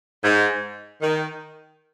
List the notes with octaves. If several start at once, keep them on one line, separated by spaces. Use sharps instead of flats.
G#2
D#3